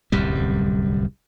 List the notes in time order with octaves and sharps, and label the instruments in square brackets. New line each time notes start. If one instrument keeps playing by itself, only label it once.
[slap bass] D1 C2 F#2 G3